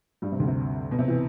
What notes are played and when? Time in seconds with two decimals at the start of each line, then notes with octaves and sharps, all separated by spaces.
0.22 G2 G3
0.32 C3
0.39 D2 D3
0.48 C3
0.91 B2
0.99 C3
1.08 E3